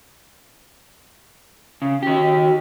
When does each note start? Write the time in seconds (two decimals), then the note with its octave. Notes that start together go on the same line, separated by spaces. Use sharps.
1.82 C#3
2.03 D#3 F#4 G4